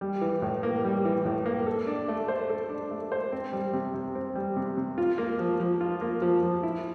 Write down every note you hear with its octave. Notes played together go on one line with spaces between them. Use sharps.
G3
E3
A2
A#3
G3
E3
A2
A#3
A4
D4
A3
C5
A4
D4
A3
C5
C4
G3
C3
C3
C4
G3
C3
C3
F4
A#3
F3
F3
F4
A#3
F3
F3
E4